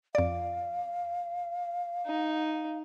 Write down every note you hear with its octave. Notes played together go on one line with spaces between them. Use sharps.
F2 D5 F5
D#4